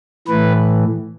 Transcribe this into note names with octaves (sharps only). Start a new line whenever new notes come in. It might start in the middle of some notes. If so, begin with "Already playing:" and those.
A2 E3 B4